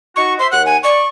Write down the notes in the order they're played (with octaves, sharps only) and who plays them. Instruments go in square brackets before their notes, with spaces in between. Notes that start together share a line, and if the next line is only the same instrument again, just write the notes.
[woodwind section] D#4 F#4 [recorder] C#6
[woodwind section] C5 E5 [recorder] C6
[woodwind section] D#2 F#5 [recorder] F#6
[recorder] G#5
[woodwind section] D5 [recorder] C#6